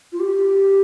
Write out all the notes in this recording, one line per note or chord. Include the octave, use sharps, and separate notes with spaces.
F4
G4